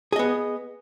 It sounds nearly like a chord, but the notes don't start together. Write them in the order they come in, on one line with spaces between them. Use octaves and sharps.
G#4 D#5 B3